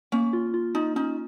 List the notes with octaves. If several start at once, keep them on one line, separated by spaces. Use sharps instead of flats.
A#3 C#4
F4
F4
D#4 F4
C#4 D#4